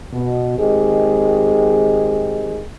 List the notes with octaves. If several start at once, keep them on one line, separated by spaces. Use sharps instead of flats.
B2
D#3 G#3 C4 G4 G#4 D#5